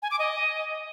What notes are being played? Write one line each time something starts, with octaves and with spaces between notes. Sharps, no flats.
G#5
D6
D#5